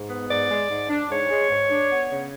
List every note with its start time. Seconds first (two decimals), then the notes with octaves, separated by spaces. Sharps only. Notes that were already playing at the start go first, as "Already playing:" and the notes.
Already playing: G#2
0.10 B3
0.29 G#2 D5
0.49 G#3
0.69 G#2
0.90 D4
1.10 G#2 C#5
1.29 G#3
1.50 G#2
1.70 D4
1.89 B3
2.10 C#3